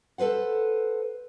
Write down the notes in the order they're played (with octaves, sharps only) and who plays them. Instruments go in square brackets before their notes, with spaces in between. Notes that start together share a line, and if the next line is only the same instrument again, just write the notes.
[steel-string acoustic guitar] A4 B4 C5 F#5